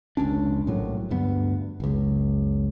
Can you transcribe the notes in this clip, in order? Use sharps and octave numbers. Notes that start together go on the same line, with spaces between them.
F1 C#2 C#4 D4
A#1 A2 F#3
D2 G2 B3
F#1 C#2